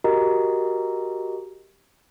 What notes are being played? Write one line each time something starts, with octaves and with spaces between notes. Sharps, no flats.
F#4 G4 A#4 D#5 A#5